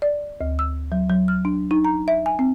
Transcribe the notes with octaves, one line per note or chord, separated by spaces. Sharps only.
D5
D2
E6
F#3
F#3
F6
D4
D#4
A#5
E5
G#5
C4